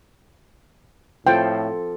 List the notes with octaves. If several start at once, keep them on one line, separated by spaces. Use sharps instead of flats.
A2 F3 C4 A4 G5 C6